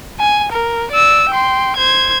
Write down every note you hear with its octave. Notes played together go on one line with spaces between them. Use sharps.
G#5
A#4
D5 E6
G5 C6
C5 G#6